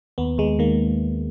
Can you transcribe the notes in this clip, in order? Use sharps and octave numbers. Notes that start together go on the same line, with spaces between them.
D#2 B3
D#2 G#3
D#3 A#3